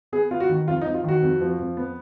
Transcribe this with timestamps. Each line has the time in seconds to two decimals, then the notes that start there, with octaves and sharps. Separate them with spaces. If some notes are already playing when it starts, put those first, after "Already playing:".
0.12 B3 G#4
0.31 B3 F4
0.40 F#4
0.49 D#3
0.68 F2 F4
0.81 D#4
0.86 F2
0.94 F4
1.04 D#3 F#4
1.22 F2
1.41 F3
1.59 F2
1.77 B3